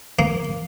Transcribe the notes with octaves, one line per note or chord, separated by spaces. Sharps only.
A#3